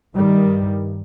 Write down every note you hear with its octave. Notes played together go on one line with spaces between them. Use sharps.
G2 D#3 G3